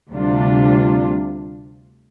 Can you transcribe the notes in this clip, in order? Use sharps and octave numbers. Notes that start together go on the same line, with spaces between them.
D2 C3 G3 D4 F4